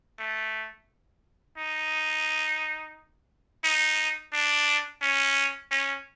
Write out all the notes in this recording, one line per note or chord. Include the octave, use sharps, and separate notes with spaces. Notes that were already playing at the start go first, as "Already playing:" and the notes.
A3
D#4
D#4
D4
C#4
C#4